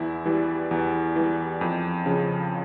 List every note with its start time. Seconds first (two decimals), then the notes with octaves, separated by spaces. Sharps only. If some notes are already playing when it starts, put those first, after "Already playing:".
Already playing: E2 E4
0.26 E3 G3
0.71 E2
1.16 E3 G3
1.61 F2
2.06 C#3 F3